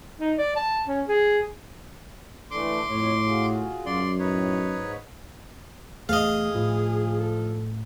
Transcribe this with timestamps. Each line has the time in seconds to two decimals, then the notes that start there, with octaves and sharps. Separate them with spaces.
0.19 D#4
0.38 D5
0.56 A5
0.87 C#4
1.08 G#4
2.51 E3 A3 D4 C6 D6
2.89 F2 A2 C#5
3.26 F4 F#4 G#4
3.86 F#2 D5 C6
4.19 A2 D#4 B4 C#5
4.69 G#2
6.09 E2 A3 G#4 D#5 F5
6.55 A2 F3
7.20 A4